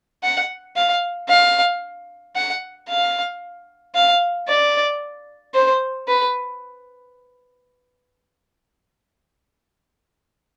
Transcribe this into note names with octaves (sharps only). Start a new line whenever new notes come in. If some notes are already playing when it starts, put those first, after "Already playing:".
F#5
F5
F5
F#5
F5
F5
D5
C5
B4